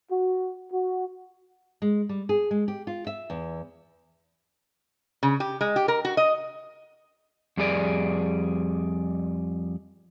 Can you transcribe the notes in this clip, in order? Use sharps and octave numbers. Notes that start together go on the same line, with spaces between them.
F#4
F#4
G#3
G3
G#4
G#3
G4
F4
E5
E2
C#3
G4
G#3
G4
A#4
F#4
D#5
F2 G3 G#4 D5